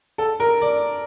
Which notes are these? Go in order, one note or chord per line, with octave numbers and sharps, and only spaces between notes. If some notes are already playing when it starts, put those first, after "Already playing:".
A4
A#4
D5